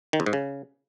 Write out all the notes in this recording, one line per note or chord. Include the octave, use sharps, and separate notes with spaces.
D#3
E2
G#2
C#3